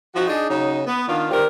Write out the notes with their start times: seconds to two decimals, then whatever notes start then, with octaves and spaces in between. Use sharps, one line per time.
0.14 F3 C4 D#4 F#4
0.27 D4 D#4 G#4
0.48 C#3 F#3 D#4
0.85 B3
1.07 D#3 B3 D4 F4
1.30 D#3 G3 C4 G4 A#4